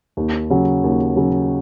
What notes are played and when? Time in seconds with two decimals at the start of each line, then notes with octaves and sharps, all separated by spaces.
0.17 D#2
0.50 C#3 F#3
0.84 D#2
1.16 C#3 F#3